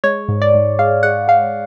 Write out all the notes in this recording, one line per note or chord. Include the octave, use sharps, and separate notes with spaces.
G#3 C#5
G#2
D5
G#2
G#3 F5
G#3 F#5
G#3 F5